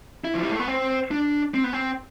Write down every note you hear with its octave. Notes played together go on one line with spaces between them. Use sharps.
E4
F3
G3
A3
B3
C4
D4
C4
B3
C4